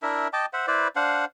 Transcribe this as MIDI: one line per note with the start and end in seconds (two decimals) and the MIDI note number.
0.02 0.28 62
0.02 0.28 64
0.02 0.28 70
0.02 0.28 76
0.33 0.46 75
0.33 0.46 79
0.33 0.46 81
0.33 0.46 86
0.53 0.66 72
0.53 0.66 76
0.53 0.66 78
0.67 0.88 64
0.67 0.88 71
0.67 0.88 72
0.67 0.88 74
0.96 1.25 62
0.96 1.25 72
0.96 1.25 77
0.96 1.25 78